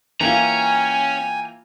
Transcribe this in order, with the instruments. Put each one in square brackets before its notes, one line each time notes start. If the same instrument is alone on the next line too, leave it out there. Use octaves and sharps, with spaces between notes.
[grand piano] E3 A#3 F4 [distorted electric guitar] C#4 [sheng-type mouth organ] G5 G#5 [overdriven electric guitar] A#5